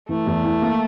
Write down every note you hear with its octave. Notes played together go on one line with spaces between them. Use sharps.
E3 A3
E2
E3
A#3